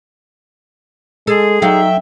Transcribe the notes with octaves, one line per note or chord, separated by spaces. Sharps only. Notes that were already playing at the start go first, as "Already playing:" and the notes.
G#3 G#4 A4
F#3 D#4 E5 F5 G5